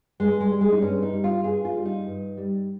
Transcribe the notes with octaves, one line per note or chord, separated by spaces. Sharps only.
G2 G#3
G#3
G3
G#3
D#4
G2 C#4
D#4
G3
F4
G2 G#4
F4
G3
D#4
G2
G3